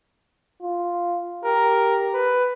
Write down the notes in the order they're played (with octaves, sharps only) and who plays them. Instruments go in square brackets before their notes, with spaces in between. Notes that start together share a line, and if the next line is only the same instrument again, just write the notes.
[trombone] F4
[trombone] G4 [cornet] A#4
[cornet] B4